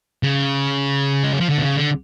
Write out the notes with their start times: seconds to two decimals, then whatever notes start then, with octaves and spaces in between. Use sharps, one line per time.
0.23 C#3
1.24 G#3
1.33 F#3
1.40 F3
1.50 D3
1.58 B2
1.64 C#3
1.77 D3